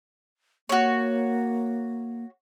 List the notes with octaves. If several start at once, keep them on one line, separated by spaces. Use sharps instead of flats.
A#3 F#4 C#5